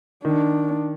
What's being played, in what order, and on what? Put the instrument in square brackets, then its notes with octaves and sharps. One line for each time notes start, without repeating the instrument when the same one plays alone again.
[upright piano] D#3 [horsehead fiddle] D4